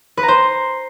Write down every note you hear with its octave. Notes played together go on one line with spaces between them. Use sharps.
B4
A#5
C5